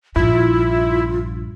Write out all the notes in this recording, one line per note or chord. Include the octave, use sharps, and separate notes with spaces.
A#1 G2 E4 F4